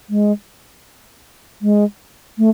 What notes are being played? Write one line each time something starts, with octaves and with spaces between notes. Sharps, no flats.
G#3
G#3
A3